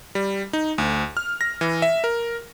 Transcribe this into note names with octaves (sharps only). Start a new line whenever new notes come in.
G3
D#4
D2
F6
A#6
E3
E5
A#4